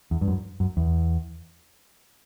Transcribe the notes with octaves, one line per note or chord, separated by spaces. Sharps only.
E2
G2
F#2
F#2
E2